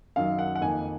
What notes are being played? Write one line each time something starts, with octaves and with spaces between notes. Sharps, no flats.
F#2 D#3 F#3 F5
F#5
F#5
F2 D#3 A#3 G#5